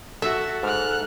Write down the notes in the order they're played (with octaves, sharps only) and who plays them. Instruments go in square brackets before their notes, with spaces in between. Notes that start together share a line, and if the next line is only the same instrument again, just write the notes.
[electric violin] F#4 [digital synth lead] A4 [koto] E5
[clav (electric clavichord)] G#2 [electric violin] F6 F#6